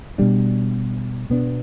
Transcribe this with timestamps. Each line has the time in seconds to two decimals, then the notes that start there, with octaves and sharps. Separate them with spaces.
0.18 B2 G3 D4
1.30 B2 B3 D4